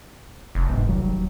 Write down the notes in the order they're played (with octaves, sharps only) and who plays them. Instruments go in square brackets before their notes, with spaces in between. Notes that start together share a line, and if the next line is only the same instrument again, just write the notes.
[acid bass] F1
[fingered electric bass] B1 G#2
D#1 F#3 G3